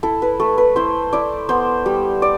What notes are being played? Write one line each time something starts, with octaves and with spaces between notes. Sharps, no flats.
E4 A4
B4
A3 A4
B4
E4 C5
E4 D5
B3 C5
G3
D5